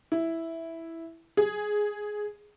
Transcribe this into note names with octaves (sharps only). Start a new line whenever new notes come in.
E4
G#4